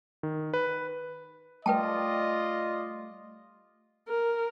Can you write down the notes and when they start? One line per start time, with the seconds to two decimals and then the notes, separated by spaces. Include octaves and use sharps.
0.23 D#3
0.54 B4
1.66 G3 A3 F4 B4 D5 D#5 G5 A5
4.08 A#4